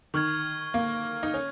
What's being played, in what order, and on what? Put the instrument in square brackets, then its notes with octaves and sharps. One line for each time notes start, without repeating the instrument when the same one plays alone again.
[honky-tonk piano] D#3 [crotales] C#6 F6 G#6
[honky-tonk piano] A#3
D#4
C#4